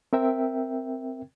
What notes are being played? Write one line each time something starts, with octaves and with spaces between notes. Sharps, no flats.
C4 A#4 E5 G5